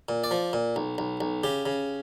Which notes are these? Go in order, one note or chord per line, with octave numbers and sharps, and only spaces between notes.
A#2
D5
F3
A#2
B1
B1
B1
C#3 G4
C#3